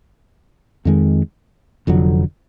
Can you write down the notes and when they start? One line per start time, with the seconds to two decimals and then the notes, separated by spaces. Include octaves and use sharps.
0.85 F2 D#3 G#3
1.87 F1 F2 D3 F#3